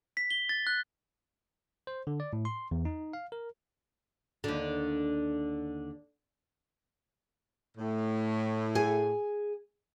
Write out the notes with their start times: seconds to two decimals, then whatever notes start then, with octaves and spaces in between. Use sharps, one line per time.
0.17 B6
0.31 G7
0.49 A6
0.67 F#6
1.87 C5
2.07 D3
2.20 D5
2.33 A2
2.45 C6
2.71 E2
2.85 D#4
3.13 F5
3.32 A#4
4.44 D#2 D3
7.77 A2
8.75 G#4 G#5